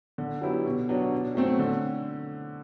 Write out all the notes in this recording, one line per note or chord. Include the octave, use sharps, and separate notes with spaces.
D3
F#3 B3 E4 G4
B2
F#3 B3 D4
B2
F#3 A3 C4
D3